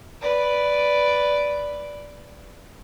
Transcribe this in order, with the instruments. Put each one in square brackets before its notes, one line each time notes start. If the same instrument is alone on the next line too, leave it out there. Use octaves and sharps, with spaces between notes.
[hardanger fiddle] B4 D5